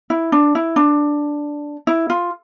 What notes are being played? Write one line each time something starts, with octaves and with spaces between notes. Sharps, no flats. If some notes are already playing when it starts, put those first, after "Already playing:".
E4
D4
E4
D4
E4
F4